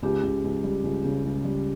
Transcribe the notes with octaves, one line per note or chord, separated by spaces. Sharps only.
C#2 G4
C#2
C#2
G3
C#2
C#3
C#2
G3